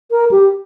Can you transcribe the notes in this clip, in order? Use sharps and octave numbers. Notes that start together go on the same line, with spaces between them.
A#4
G4